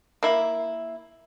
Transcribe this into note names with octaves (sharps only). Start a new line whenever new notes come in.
A#3 E4